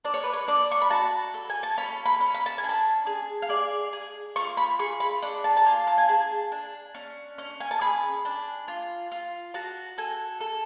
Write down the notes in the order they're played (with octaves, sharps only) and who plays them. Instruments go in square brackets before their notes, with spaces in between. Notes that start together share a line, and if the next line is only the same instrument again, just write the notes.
[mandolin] D4 D5
C#5
B4
C#5
D4 D5
C#6
B5
F#4 A5
A4
G#5
A5
C#4 B5
B5
C#4
B5
A5
G#5
D4
A5
G#4
F5
G#4 D5
G#4
F4 C#6
B5
G#4 C#6
B5
D4 C#6
A5
A5
F4 G#5
A5
G#5
G#4 A5
D4
C#4
C#4
G#5
A5
G#4 B5
D4
F4
F4
F#4 A5
A4 G#5
A4